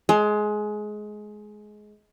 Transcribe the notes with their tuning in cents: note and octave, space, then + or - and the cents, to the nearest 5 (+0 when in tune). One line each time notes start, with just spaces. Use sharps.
G#3 +20